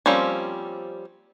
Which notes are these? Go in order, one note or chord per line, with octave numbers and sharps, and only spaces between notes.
F3 G3 A#3 C4 C#4